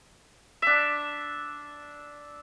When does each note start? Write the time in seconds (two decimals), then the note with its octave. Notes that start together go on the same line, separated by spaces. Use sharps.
0.62 D4 E5